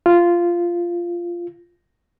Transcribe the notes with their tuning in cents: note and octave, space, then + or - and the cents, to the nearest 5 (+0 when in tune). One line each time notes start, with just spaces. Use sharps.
F4 -10